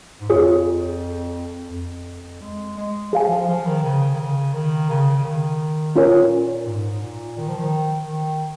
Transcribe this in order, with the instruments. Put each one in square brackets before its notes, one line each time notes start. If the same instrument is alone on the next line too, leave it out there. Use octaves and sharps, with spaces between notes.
[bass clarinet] G#2
[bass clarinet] F2 [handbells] F4 G#4 C#5
[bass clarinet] F2
G#3
G#3
[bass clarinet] F3 [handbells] G#4 F5 G#5
[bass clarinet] F3
F3
D#3
C#3
D#3
C#3
D#3
C#3
C#3
D#3
[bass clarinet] A#2 [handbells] C#4 F4 A#4 C#5 G#5
[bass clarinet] G#2
A#2
D#3
F3
D#3
D#3